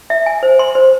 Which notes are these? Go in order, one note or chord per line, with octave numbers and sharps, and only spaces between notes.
E5
G#5
C5
C6
C5